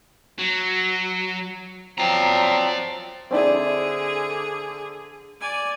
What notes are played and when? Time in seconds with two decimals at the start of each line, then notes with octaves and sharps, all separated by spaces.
0.39 F#3
1.98 F3 F#3 C4 D5 A#5
3.31 D3 C4 D4 E4 G#4
5.41 D5 G#5